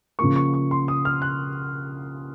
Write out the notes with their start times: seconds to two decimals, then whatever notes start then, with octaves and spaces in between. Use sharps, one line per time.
0.19 C#3 F3 A#3 C#6
0.36 C#6
0.54 C#6
0.71 C6
0.88 D#6
1.05 F6
1.22 F#6